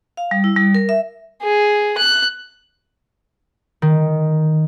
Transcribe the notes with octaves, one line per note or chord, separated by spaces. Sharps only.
F5
G3
E4
G3
A#4
E5
G#4
F#6
D#3